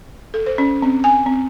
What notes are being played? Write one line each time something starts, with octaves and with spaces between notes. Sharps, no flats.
A4
C5
C#4
C4
G#5
C4